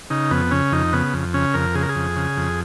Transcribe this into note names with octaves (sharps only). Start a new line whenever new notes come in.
C#3 D#4
F2 B3
C#3 C#4
F2 D#4
C#3 B3
F2
C#3 C#4
F2 A#4
C#3 G#4
A#4
G#4
F2
C#3
F2